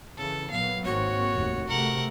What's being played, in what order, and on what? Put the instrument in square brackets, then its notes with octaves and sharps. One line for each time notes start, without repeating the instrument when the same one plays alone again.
[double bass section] C#3 E3 [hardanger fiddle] A4
[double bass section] A#2 F#3 B3 [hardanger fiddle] F5
[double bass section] G#1 A#3 C4 [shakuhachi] F#4 [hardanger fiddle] C#5
[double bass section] F1 D#2
[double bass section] C3 A3 [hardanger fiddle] A#4 F#5